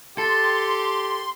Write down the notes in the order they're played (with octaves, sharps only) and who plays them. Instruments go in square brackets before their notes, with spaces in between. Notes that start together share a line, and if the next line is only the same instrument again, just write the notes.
[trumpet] G4 [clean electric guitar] A4 [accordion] C6